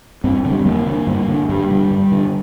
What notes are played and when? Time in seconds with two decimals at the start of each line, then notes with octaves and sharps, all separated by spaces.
0.24 G2 C4
0.45 D3
0.51 G3
0.66 F2 A#3
0.87 D3
1.07 G2
1.28 D3
1.49 G2 G3
1.71 D3
1.91 G2
2.12 D3